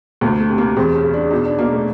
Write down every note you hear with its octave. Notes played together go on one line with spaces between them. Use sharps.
D2 A#3
A3
C3
A#3
E2 C4
C#4
C#3
D4
B2 D#4
D4
B2 A#3
A3